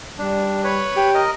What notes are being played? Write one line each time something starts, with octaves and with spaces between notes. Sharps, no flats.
G3 D4
B4 C#5 B5
G4
A#4 D#5